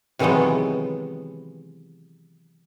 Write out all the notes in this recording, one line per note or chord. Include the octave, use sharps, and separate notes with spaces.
C3 D#3 E3 F#3 G#3 B3